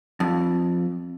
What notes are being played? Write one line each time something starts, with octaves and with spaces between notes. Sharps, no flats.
F2